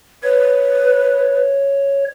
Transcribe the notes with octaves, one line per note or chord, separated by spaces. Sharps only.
B4 C#5